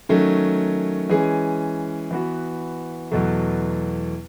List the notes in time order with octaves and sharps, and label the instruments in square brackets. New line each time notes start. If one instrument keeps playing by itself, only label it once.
[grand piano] D#3 F#3 A3 C#4
E3 G#3 C#4 G#4
E3 B3 F#4
E2 B2 F#3 A3